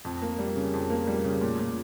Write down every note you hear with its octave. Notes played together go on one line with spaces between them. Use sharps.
F2
A#3
G3
C#3
F2
A#3
G3
C#3
A#2
A#2